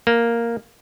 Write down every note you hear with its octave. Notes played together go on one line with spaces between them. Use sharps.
A#3